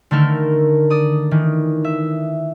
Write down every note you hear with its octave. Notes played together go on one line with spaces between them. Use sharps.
D3 D#3 A3 A4 A#4
D5 D#6
D#3 E3
E5